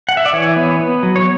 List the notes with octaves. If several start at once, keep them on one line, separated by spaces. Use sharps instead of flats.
F#5
E5
D5
E3 C#5
B3
B3
F#3
C#5